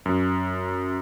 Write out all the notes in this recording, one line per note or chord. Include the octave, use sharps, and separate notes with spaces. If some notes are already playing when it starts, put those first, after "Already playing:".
F#2